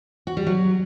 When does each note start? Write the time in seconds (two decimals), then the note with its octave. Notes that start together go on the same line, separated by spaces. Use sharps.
0.27 F#4
0.37 G3
0.47 F#3